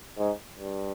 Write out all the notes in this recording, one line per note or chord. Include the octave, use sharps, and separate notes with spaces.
G#2
G2